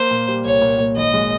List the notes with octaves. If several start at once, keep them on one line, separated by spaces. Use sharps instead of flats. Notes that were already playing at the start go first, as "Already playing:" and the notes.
Already playing: A#3 C5
A#2
G3
C2 C#5
A#2
A#2
G#1 D#5
G#3